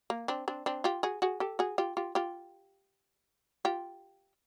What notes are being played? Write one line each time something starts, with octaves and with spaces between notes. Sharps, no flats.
A#3
C4 D4
C4 D4
C4 D4
F4 G4
F#4 G#4
F#4 G#4
G4 A4
F#4 G#4
F4 G4
F4 G4
F4 G4
F4 G4